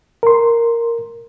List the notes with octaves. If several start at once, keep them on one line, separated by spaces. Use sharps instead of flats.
A#4 C6